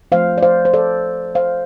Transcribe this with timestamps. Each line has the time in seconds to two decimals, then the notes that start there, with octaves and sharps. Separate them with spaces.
0.12 F3 A3 C4 C5 F5
0.38 D5
0.43 C5 F5
0.65 C5
0.74 A4 D5
1.35 C5 F5